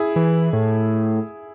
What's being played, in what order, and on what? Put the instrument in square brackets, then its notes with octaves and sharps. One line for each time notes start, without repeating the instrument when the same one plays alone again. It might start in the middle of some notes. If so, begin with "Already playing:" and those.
Already playing: [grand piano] E4 G#4
[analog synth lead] E3
A2